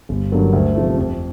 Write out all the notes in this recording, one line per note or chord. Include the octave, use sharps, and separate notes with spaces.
G1
G2 D3 F#3 A#3
D2
C3 F3 A3
F2